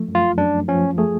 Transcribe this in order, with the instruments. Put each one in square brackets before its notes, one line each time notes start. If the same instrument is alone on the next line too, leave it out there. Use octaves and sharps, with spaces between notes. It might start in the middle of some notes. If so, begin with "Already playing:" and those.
Already playing: [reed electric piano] F3 A3
F#2
[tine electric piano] F4
[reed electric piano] F#2 [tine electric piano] D4
[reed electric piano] F3 [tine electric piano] C#4
[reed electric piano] A3 [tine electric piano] G#4